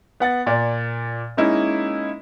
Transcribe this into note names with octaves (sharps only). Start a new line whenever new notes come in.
B3 F#5 A6
A#2 D5
G#3 A#3 C#4 D#4 E4 A#4